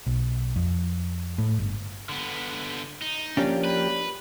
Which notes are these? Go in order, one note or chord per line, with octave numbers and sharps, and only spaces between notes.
B1
F2
A2
G1
D3 B3
D#4
F3 A#3 C#4 D4 G4
B4